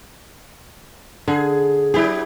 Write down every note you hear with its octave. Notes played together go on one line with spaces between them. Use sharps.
D3 G#4
F#3 B3 E4 G4 G#4